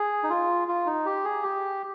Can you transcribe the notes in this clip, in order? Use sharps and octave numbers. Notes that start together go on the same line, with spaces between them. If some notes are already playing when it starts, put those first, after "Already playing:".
Already playing: G#4
D#4
F4
F4
D#4
G4
G#4
G4